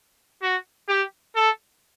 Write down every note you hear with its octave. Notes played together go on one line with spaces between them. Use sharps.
F#4
G4
A4